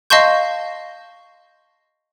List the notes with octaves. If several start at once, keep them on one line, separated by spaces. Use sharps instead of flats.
D#5 F5 A5 C6 C#6 G6